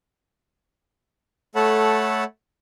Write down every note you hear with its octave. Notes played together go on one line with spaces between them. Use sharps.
A3 A4 C#5 F#5 A5 B5